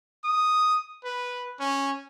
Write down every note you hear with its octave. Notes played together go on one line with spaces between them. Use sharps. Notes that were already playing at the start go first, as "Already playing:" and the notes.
D#6
B4
C#4